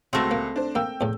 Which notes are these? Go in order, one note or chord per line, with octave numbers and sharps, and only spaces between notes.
C#2 A3 C4 F#4 A#6
A#3
D4 C5
A#3 G5 E6
E2 A2